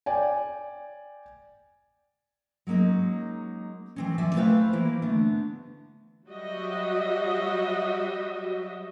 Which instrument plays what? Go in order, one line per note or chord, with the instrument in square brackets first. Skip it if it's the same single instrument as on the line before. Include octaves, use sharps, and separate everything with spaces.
[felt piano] D5 G5 G#5
[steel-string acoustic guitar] F#3 G#3 A#3 C#4 D#4
E3 C4 C#4
F2 F3 D5 E5 G#5
A3 C4 E4 B4 C5 F5
E3 G3 A#3 E4
D3 A3 B3 D4
[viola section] F#3 G3 F#4 G4 D#5 E5